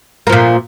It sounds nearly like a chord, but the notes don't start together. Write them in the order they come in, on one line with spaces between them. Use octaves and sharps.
A#3 F3 A#2